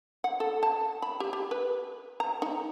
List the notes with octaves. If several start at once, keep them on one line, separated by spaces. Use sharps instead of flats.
F#5
A4
A5
B5
G4
G4
B4
A#5
D#4